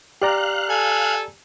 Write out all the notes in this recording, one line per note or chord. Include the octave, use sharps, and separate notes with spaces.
G4 D5 F5 A#5 F#6
A4 G#5